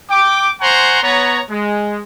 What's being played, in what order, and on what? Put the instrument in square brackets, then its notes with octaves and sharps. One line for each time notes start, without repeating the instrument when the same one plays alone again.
[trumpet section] G5 D6
C5 F#5 G#5 A#5 C6 C#6
B3 C#5 A#5
G#3